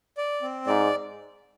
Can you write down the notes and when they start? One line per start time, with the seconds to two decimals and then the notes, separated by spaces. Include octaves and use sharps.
0.18 D5
0.42 C4
0.67 G#2 D5